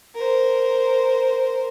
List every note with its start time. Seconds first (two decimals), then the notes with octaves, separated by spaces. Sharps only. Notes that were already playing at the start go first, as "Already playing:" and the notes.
0.15 A#4 C5